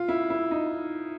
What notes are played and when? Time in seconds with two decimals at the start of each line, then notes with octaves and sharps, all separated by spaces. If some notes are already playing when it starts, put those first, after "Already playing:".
Already playing: F4
0.08 E4
0.30 E4
0.51 D#4